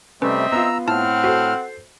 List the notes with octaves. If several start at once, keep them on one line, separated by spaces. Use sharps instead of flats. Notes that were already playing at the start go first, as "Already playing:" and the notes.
C3 G3 A3 C4 C#4 B4 D#5 E5
B3 F4 A#5 E6
A2 C4 E4 F#5 A5 F6
F#4 A4 C5